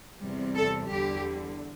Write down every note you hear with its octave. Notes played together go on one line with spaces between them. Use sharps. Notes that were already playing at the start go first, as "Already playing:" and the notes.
E2 C3 G3
A4
E2 D3 G3 G4